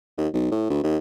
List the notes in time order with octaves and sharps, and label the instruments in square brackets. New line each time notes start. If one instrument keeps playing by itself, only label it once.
[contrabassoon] D#2
B1
A2
D2
D#2